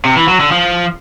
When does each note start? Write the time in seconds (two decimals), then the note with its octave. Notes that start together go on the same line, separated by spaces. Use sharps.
0.05 C3
0.17 E3
0.28 F#3
0.40 D3
0.52 F3